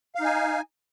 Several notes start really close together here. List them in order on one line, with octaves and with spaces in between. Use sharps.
F5 D#4 G#5